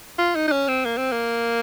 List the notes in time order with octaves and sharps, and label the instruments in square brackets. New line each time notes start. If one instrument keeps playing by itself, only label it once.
[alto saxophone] F4
D#4
D#4
C#4
C4
A#3
C4
A#3